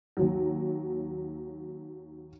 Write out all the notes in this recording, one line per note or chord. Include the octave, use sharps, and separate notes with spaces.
D#2 F#3